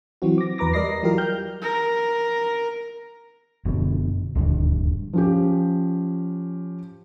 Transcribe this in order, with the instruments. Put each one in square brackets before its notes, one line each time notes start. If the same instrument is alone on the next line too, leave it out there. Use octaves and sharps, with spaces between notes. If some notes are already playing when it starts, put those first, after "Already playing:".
[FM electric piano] E3 F#3 C4 F#4
D6 A#6
E2 B4 A#5 D6 A#6
G3 A#4 D5 D#5 A#6 C7
E3 F#3 F4 G4 A#4
G5 F6 G6
[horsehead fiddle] A#4
[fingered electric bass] F#1 B2 D3
D#1 D2 G2
[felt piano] F3 C#4 G4